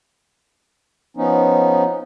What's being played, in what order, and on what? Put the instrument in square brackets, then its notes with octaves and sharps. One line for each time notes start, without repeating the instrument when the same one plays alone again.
[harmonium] F3 B3 C#4 D#4